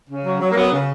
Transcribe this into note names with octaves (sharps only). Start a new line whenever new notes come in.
C#3
F#3
F#3
A#3
F#3 B3
C#3